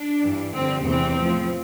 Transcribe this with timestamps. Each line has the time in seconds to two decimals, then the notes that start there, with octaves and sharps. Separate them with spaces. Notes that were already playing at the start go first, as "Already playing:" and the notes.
Already playing: D4
0.22 G2 E3
0.53 G2 D3 F3 C4
0.85 E2 C3 E3 C4
1.17 A2 F3